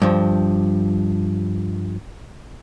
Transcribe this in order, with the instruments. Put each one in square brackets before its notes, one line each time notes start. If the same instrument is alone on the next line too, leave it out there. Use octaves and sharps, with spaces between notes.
[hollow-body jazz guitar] G2 F3